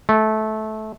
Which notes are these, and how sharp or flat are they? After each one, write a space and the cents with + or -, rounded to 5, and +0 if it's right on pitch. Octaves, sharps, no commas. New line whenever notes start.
A3 -20